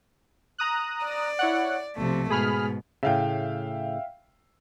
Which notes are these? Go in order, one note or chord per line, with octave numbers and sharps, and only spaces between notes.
A#5 D#6 F#6
D5
E4 C#5 F#5
B1 C3 F3 A3
G#2 B2 G#4 B5 F6
A2 C#3 E5 F5 G5